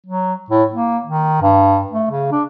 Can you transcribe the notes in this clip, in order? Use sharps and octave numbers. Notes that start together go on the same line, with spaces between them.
F#3
A2
A#3
D#3
G2
A3
C#3
D4